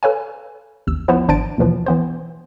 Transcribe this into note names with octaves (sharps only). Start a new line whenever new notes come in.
A4 B4 C#5 F5 G#5
A1 D#2 E6
F3 B3 E4 C5
G#1 D4 C5 A5 A6 D7
D#2 B2 E3 F3
E3 B3 C5